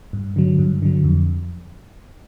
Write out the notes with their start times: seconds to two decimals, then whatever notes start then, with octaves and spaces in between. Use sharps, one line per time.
0.13 G2
0.36 D3 F#3
0.59 G2
0.82 D3 F#3
1.04 F2